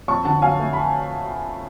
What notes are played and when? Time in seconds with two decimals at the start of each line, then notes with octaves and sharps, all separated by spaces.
0.08 F2 A5 C#6
0.25 D3 F#5 A5
0.42 F#3 F5 G#5
0.59 A3
0.73 B5